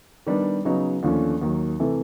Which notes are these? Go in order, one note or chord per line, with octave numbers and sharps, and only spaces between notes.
D#3 G3 B3 D4
C#3 F#3 B3 D#4
D#2 D3 F3 A3 C#4
D#2 D#3 F#3
C3 E3 A3